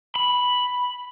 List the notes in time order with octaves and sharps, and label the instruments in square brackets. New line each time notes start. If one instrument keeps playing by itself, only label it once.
[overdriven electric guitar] B5